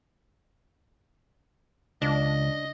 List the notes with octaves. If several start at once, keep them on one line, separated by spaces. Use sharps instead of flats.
C#2 D4 D#5